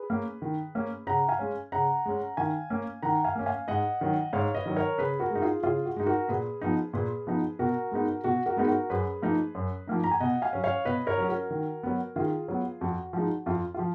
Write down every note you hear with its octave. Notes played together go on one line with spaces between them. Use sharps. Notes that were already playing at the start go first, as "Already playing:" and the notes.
Already playing: G#4 B4
A#3 C#4
D#3
A#3 C#4
C#3 F#5 A#5
F5 G#5
G#3 C#4
C#3 F#5 A#5
G#3 C#4
D#3 F5 G#5
A#3 C#4
D#3 F#5 A#5
F5 G#5
A#3 C#4
F5 G#5
G#2 D#5 F#5
D#3 F#3
G#2 C#5 F5
B4 D#5
D#3 F#3
A#4 C#5
C#3 G#4 B4
F#4 A#4
G#3 D#4
F4 G#4
C#3 F4 G#4
F#4
G#3 D#4
F#4 A#4
A#2 G#4 B4
F3 B3 D#4
A#2 G#4 B4
F3 B3 D#4
B2 F#4 A#4
G#3 B3 D#4
B2 F#4
F#4 A#4
G#3 B3 D#4 G#4
F#4 A#4
F#2 G#4 B4
F3 A#3 D#4
F#2
F3 A#3 D#4
A#5
G#5
B2 D#5 F#5
F5 G#5
F#3 C#4
C#5 F5
B2 B4 D#5
A#4 C#5
F#3 C#4
F#4 A#4
D#3
F#3 B3
D#3 F4 G#4
F#3 B3
F2 F#4
F3 G#3 D#4
F2 F4
F3 F4